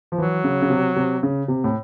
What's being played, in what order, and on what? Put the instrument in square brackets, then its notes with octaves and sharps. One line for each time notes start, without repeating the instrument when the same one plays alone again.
[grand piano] F3
[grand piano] E3 [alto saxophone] F#3
[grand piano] C#3
C#3
C3
C3
C#3
C3
A2